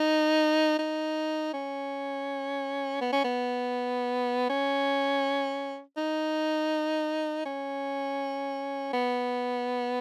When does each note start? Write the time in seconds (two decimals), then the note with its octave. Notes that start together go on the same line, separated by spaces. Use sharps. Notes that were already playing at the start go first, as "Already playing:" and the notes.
Already playing: D#4
0.79 D#4
1.53 C#4
3.01 B3
3.13 C#4
3.24 B3
4.49 C#4
5.97 D#4
7.45 C#4
8.93 B3